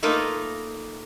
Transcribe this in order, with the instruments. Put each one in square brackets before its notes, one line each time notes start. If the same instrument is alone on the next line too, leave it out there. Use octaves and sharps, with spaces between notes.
[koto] A3 A#3 D#4 F4 A#4 B4